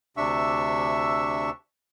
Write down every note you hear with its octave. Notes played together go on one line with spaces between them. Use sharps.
D2 C3 D4 E5 C#6 E6